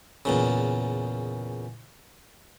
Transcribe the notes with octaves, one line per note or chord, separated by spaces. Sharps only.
E2 A#2 C#3